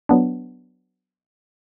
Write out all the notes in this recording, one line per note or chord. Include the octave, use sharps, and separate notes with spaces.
F#3 B3 D4